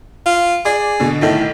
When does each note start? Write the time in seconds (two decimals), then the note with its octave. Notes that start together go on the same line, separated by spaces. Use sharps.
0.26 F4
0.65 G#4 D5 D6
1.00 B2 D3
1.22 B1 A2 D#3